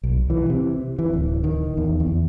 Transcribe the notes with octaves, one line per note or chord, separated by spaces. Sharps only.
B1
E3
C3
E3
D1
D#3
E2
E2